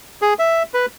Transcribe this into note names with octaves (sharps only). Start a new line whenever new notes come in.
G#4
E5
B4